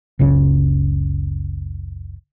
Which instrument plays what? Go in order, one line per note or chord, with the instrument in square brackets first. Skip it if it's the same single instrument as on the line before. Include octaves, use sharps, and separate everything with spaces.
[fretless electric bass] F#1 C#2 C#3